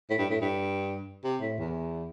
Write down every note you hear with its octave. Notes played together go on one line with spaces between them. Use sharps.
A2
G2
A2
G2
C3
A2
E2